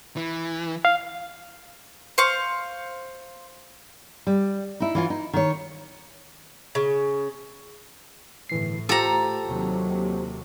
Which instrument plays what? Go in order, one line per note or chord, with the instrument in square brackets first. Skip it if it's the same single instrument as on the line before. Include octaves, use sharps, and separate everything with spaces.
[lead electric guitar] E3
[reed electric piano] F5
[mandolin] C5 F5 C#6
[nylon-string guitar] G3
D#4 E4
E3 C#4 F4
D#4
D#3 C#5
[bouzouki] C#3
[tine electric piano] G1 E3 C7 [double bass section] A2
[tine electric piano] F4 G4 C5 [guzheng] A4 A#5
[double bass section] D#2 C3 F#3